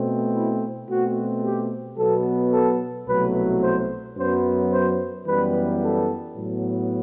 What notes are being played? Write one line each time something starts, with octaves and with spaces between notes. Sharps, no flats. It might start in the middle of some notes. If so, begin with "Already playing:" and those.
Already playing: B2 A3 C4
E4
B2 A3 C4 F#4
G4
B2 F#3 B3 A4
A4
C2 B2 F#3 A3 B4
C5
F#2 F#3 B3 C5
C5
F#2 E3 G3 B3 B4
A4
A2 F#3 B3